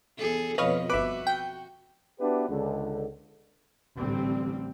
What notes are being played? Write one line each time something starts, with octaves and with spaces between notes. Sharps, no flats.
E2 G#4 A4
F2 B2 F3 B4 C#5 D#5 F5
G1 F#4 B4 E5 D6
G5
B3 D4 E4 F#4 G4 B4
C#2 D3
A1 D3 G3 C4